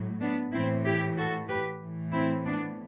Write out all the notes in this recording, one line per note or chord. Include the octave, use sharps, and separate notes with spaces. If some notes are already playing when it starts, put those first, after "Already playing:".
Already playing: A2 F#3
B3 D4
A2 E3 C4 E4
E4 G4
F#4 A4
G4 B4
A2 E3
C4 E4
B3 D4